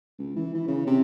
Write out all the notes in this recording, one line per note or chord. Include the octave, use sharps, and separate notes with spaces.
C#2
E3
E3
C#3
C3